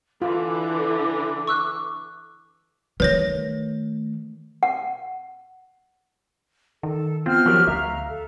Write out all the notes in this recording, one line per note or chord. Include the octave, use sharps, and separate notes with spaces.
D3 E3 F4 D6
C#6 E6 F#6
D#3 A3 B4 C#5 A#6
F#5
D#3 A4
B3 C4 F4 F6
F3 F#3 G4 A#4
D2 E5 F5 A#5
A4